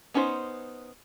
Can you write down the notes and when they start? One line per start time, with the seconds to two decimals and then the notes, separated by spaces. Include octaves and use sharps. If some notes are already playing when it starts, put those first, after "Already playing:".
0.14 B3 C#4 D#4 B4 C5